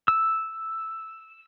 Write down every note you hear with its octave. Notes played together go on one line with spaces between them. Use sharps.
E6